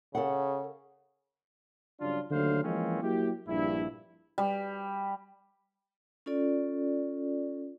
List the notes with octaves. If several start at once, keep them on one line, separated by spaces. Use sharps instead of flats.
C#3 A4 F#5
G2 C#3 F#3 D4 F4
D#2 D3 F#3 A3 C5 F5
E3 F3 G#3 A#3 C4 C#4
F#3 A#3 E4 G4
A#1 G2 E4
G3
C#4 F4 A4 D5